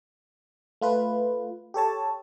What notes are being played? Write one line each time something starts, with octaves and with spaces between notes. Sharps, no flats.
A3 F4 B4
G4 A4 C#5 A5